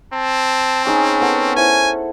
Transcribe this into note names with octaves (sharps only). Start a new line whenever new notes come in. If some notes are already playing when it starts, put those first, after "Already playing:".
C4 A5
C#4 D#4 G#4 A5
B3 A4 F#5
E4 C5 G#5